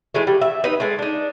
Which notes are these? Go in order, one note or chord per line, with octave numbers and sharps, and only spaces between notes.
E3 G#3 A3
G3
E5
D#4 B4
G#3 A3
D4 D#4